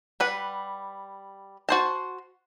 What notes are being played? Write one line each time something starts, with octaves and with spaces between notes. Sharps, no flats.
G3 B4 F#5
F#4 C5 A5